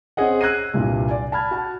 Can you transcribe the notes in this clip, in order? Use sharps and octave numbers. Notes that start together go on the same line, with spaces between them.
C4 C#4 G#4 D#5 F#5
E6 F#6 G#6 A#6 C7 D#7
C2 G2 A#2
D5 G#5
A5 B5 F6 G#6
F#4 A5